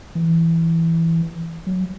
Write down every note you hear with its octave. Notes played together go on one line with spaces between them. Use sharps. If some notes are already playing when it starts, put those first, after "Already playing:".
E3
F#3